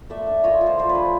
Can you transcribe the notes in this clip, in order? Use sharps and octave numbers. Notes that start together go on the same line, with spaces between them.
A3 D5 E5
D4
F4 C#5 D#5
F4
C5 D5
F3 C5
B4 C#5
D4